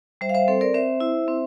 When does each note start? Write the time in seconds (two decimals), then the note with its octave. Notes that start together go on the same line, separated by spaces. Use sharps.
0.21 G3 C5 E5
0.29 F5
0.34 C5 E5
0.48 C4 A4 C5
0.61 A#4 D5
0.74 C4 C5 E5
1.00 E4
1.28 C4